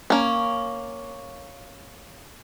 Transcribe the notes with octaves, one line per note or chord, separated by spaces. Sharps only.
A#3 C#4